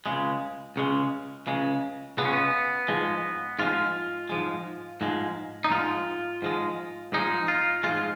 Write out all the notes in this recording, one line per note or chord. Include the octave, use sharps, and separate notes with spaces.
C#2 C#3 G#3
C#2 C#3 G#3
C#2 C#3 G#3
C#2 C#3 G#3 B3
C#4
B3
G#2 F3 G#3
G#2 F3 G#3 F4
G#2 F3 G#3
G#2 F3 G#3
D#4
G#2 F3 G#3 F4
G#2 F3 G#3
G#2 F3 G#3 D#4
F4
G#2 F3 G#3 F4